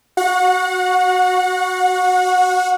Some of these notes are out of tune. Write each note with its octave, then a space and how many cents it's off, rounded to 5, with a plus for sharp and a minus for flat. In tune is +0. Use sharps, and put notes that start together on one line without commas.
F#4 +0 F#5 -30